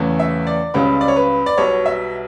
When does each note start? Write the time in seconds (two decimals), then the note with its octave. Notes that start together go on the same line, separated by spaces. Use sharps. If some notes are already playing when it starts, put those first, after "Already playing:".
Already playing: E2 C#3 E3 A3
0.19 E5
0.47 D5
0.74 C#2 C#3 G3 B3 B4
1.01 D5
1.08 C#5
1.16 B4
1.46 D5
1.58 B1 B2 G3 B3 C#5
1.86 E5